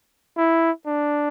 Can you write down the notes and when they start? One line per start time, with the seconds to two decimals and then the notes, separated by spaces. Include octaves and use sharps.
0.37 E4
0.87 D4